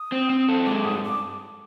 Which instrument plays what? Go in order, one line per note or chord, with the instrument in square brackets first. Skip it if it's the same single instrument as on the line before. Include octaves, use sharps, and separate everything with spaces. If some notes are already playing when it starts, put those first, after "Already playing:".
Already playing: [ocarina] D#6
[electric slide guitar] C4
C4
A4
[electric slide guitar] G#3 [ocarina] D6
[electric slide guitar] G2 [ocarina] D#6
[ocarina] D6